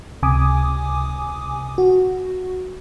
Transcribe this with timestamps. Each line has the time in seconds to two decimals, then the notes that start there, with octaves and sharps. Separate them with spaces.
0.23 C#2 C3 G#5 D6 D#6
1.78 F#4